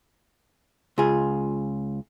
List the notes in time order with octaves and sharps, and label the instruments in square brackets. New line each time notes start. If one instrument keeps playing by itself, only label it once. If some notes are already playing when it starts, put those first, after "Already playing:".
[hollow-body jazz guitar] C#2 F4 G#4